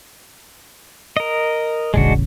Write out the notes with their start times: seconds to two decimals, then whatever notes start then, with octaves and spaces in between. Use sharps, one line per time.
1.17 A#4 D#5
1.94 D#1 A1 C#3 G#3 D4 F#4